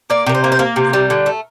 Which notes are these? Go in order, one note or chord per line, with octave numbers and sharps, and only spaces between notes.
A#3 D5
C3 A#4
C5
A#3
C5
A#3 A#4
C3
G3
D3
A3